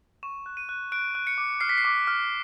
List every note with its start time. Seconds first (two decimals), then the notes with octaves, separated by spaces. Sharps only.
0.23 C#6 E7
0.46 F#6
0.57 D#7
0.69 F#6
0.92 F#6 D7
1.15 F#6
1.27 C#7
1.38 D6
1.61 F6 C7
1.69 B6
1.78 C7
1.85 D6
2.07 F6